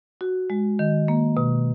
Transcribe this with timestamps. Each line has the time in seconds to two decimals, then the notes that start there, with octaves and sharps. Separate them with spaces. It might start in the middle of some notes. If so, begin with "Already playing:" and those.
0.21 F#4
0.50 G#3
0.79 D#3
1.08 A#3
1.37 B2